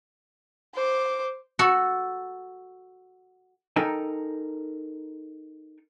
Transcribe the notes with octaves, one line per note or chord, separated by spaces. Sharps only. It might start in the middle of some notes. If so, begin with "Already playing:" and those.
C5 D6
F#4 A4
D#4 A4 A#4 G5 G#5